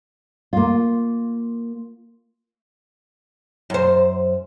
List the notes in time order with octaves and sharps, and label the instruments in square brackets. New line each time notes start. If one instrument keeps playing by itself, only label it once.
[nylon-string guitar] A#3 F4
[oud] F#2 C5